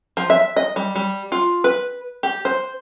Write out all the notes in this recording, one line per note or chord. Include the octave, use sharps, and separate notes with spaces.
F3
E5
D#5
G3
G3
F4
B4
G4
C5